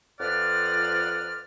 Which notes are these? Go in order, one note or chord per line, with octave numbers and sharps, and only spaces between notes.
F2 F3 B4 D5 F#5 F6